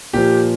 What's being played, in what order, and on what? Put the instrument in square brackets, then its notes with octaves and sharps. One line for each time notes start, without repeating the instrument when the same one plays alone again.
[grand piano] A#2 F3 G4